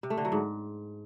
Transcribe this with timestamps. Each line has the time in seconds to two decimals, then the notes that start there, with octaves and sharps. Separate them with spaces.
0.03 C3
0.10 A3
0.18 D3
0.25 F#3
0.32 G#2